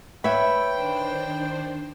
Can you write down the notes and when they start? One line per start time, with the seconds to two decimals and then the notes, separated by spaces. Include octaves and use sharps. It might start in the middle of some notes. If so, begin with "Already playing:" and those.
0.24 B4 C#5 E5 G5 B5
0.72 D#3 D4 C5